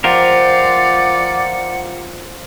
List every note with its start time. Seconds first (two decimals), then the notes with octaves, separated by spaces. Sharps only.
0.04 F3 F4 G4 A#4 D5 F#5